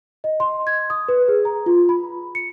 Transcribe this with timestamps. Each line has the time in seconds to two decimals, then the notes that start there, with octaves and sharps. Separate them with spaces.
0.24 D#5
0.40 C6
0.67 G#6
0.90 D#6
1.09 B4
1.28 G#4
1.45 A#5
1.66 F4
1.89 B5
2.35 C#7